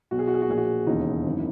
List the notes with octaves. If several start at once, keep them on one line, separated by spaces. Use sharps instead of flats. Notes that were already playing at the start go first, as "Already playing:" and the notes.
B1 B2 F#4
G#4
F#4
G#4
F#4
A#1 A#2 G#4
F#4
E1 D#2 C#3 E3 D#4
G#1 F#2 E3